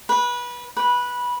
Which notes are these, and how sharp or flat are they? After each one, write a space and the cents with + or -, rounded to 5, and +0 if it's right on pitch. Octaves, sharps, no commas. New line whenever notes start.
B4 -25
B4 -15